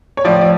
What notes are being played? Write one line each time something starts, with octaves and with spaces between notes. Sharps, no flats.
C#5
A2 F3 D5
D5